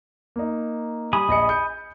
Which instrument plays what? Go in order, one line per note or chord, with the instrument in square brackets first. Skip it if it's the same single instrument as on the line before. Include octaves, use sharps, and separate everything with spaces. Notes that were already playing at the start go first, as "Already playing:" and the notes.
[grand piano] A#3 D#4
[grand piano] G3 [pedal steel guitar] G#5 B5 D#6
[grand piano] A#1 D#5 C#7
G6 C#7